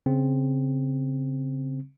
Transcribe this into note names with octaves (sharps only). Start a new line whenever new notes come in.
C#3 C4